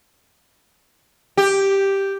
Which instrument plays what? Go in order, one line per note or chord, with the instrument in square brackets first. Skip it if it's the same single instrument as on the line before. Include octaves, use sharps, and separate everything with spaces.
[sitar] G4